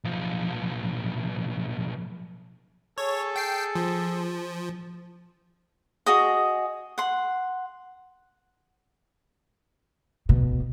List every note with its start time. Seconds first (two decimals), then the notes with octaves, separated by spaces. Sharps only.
0.04 B1 F3
2.98 G#4 A4 C#5
3.36 G5 C7
3.75 F3
6.06 F#4 G#4 D#5
6.98 F#5 C6
10.29 B2